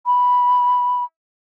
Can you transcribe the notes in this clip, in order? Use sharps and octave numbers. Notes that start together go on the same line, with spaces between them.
B5